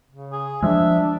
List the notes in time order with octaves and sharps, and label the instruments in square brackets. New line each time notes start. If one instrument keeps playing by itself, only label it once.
[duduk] C#3
[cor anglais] G#4
[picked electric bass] F3 G#3 [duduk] D4 [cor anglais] E5